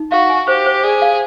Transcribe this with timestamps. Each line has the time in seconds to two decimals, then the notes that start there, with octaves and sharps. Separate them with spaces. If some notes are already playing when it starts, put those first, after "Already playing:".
Already playing: D#4
0.11 F#4 F5
0.30 G#5
0.48 G4 C5
0.66 C5
0.83 G#4 D5
1.02 F5